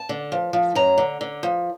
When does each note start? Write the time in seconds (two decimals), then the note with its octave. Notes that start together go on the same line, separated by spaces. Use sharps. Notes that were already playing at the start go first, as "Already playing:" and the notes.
Already playing: A5
0.09 D3
0.32 F3
0.53 F3
0.75 F#2 A#5
0.98 D3
1.21 D3
1.43 F3